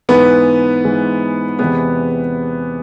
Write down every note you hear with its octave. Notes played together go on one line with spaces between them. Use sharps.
G#2 E3 G#3 B3 B4
G#2 E3 G#3
E2 C3 G#3 B3 B4